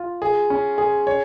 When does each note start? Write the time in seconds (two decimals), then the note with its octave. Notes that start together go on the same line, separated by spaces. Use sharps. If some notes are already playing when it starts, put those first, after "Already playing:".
Already playing: F4
0.22 G#4
0.50 C#4
0.78 G#4
1.07 C#5